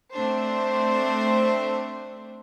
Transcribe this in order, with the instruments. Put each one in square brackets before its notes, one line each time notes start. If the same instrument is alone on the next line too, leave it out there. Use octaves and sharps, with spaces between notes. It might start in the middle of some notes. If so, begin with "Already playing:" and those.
[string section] A3 C4 D4 C5